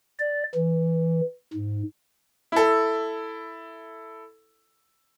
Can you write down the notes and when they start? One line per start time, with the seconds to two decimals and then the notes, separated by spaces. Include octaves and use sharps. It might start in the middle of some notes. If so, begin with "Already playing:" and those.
0.19 D5
0.55 E3
1.53 G#2
2.52 E4 A4